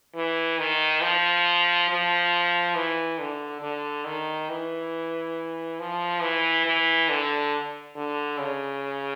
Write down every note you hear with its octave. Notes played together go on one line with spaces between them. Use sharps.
E3
D#3
F3
F3
E3
D3
D3
D#3
E3
F3
E3
E3
D3
D3
C#3